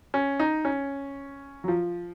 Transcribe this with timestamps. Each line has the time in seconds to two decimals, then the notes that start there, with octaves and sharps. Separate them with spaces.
0.14 C#4
0.40 D#4
0.65 C#4
1.64 F#3
1.68 F3